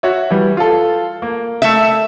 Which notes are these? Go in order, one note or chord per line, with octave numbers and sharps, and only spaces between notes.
F#4 C#5 E5
E3 G3
F4 A4
A#3
A3 E5